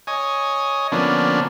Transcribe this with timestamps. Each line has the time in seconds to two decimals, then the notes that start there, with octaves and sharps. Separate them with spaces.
0.07 C#5 D#5 G#5
0.92 D3 F3 A#3 B3 C#4 D4